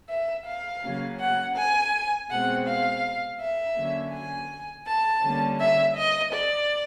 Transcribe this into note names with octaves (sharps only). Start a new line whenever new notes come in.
E5
F5
C#3 F#3 A#3 C#4
F#5
G#5
B2 G#3 C4 F#5
F5
E5
D3 F#3 A#3 C#4
G#5
A5
D3 G3 A#3 C#4
E5
D#5
D5